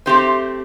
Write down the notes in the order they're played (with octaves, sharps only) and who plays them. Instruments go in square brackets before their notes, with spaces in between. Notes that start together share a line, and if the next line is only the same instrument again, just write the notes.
[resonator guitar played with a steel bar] A3 C4 G4 C5